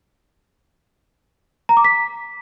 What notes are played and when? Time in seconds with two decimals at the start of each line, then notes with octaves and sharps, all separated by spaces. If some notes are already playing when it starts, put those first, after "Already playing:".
1.69 A#5
1.77 D6
1.85 B6